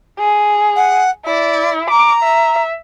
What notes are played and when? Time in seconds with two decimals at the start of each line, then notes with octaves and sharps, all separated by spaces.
0.19 G#4
0.76 F#5
1.25 E4 D5
1.90 A#5 D6
2.23 E5